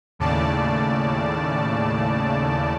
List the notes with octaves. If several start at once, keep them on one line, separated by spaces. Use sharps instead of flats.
D#2 A2 C#3 D5 A5